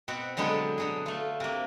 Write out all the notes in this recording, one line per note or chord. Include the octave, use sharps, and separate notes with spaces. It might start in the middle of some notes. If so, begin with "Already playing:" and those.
B2 C4 F#4
D3 F#3 G#3 B3 G4 A4
D3 F#3 G#4
A3 F4
C3 A#3